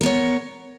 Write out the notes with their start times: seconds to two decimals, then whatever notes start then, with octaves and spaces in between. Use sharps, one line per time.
0.01 A#4
0.03 B3
0.06 C#5